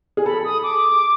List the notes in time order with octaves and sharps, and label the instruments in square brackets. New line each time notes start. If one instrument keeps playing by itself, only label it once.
[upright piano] G#4
[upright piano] A4 [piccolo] B5
[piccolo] D#6
D6